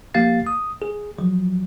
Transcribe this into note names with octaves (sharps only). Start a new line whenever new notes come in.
F3 A#3 G4 F5 A6 C7
D#6
G#4
F3 F#3